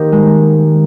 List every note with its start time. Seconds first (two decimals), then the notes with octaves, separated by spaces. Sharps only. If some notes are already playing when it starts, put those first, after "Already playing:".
Already playing: D#3 A#3 D#4 G4 A#4 C5
0.12 G#3